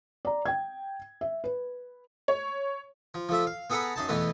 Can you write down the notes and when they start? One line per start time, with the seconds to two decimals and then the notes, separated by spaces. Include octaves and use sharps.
0.25 D5 A#5
0.46 G5 G#6
1.21 E5
1.44 B4
2.28 C#5
3.14 F3
3.29 F3 A3 E5
3.47 F5
3.70 B3 G#4 A4 F#5 A#5 B5
3.96 F#2 D#4 A5
4.09 E2 B2 E3 A3 B3 B4